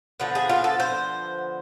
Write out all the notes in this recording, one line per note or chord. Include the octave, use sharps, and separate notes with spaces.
D3 F3 B3
G#4
F4
A4
C5